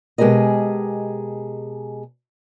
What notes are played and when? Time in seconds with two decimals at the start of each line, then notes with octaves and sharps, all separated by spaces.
0.18 B2 G#3 G4 G#4 A#4 D#5